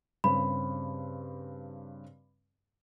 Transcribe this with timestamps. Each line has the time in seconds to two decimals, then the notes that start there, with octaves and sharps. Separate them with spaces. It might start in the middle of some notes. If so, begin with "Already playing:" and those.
0.24 G2 C#3 C4 B5